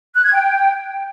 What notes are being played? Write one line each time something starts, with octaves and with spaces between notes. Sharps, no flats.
F#6
G#6
G5